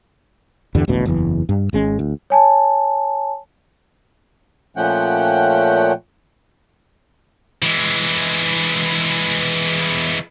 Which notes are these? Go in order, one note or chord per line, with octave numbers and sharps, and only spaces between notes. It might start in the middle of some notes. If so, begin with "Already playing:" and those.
E2 G2 D3 G3
D#1 A1 D2 B2
F#1 E2 E3
G2
G#1 G#3 C#4
D2
C#5 G#5 A5
A#2 F3 A3 C#4 F#5 G5
E3 G#3